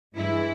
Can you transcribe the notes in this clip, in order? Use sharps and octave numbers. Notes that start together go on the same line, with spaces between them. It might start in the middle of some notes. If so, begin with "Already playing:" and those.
G2 E3 G#3 E4